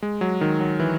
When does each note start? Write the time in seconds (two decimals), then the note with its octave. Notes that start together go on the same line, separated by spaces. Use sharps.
0.02 G#3
0.21 F#3
0.41 D#3
0.60 F#3
0.80 E3